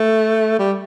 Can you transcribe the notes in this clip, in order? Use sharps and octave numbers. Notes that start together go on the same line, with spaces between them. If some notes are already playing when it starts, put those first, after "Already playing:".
Already playing: A3
G3